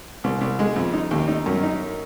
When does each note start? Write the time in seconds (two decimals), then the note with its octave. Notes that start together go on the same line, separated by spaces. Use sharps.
0.24 C2
0.41 C2
0.59 G#3
0.76 F2
0.93 D#4
1.11 D#2
1.28 D#4
1.46 F#2
1.63 D#4